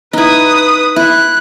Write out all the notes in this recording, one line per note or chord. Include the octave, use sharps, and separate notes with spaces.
D#4 E4 B4 D#6
E4 F#6